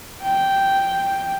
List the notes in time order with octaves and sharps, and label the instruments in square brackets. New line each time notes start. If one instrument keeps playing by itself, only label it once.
[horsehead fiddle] G5